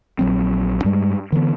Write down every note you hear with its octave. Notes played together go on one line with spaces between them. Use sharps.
A#1 F#3 C4
G2 G3 G#3
D3 E3 A#3 B3